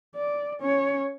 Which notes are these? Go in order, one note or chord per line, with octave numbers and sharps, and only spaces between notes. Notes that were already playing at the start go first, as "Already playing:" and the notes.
D5
C#4 C#5